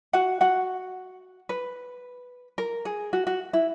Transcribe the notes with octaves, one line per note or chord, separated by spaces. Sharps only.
F#4 F#5
F#4 F#5
B4
A#4
G#4
F#4
F#4
E4